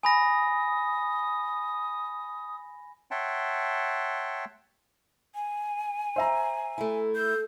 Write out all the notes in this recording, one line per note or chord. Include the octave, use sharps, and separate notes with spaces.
G#5 B5 D#6 A#6
C#5 E5 F#5 G5 A5 C6
G#5
C5 E5 A#5
A3 E4
A4 G6